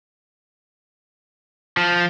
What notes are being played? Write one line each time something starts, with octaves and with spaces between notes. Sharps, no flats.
F3